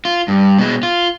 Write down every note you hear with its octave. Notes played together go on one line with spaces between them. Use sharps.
F4
G2
B2 G#3
F4